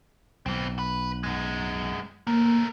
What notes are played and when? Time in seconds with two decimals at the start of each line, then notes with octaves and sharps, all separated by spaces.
0.46 B1 E3 C4
0.79 B4
1.23 F#2 G#3
2.27 A3 A#3 A#4